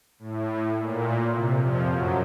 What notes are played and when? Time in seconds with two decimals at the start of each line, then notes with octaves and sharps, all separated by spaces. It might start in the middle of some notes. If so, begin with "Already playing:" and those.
0.19 A2
0.76 A#2
1.33 C3
1.61 F2 F3
1.90 F#2 F#3